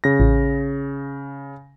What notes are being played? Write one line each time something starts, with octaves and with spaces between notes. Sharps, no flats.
C#3 A#6
A1